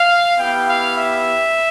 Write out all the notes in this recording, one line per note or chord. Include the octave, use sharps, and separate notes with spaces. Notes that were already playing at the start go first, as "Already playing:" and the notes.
Already playing: F5
B3 E4 G4 G5
F5
E5